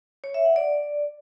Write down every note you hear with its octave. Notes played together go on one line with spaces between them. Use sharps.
C#5
E5
F#5
D5